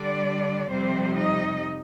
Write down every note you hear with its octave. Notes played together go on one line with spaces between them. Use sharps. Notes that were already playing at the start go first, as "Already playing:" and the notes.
Already playing: D3 G3 D4 D5
F2 C3 G3 C4 C5
D#4 D#5